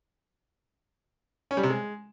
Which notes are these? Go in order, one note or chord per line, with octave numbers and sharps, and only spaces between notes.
C#4
G3
C3
G#3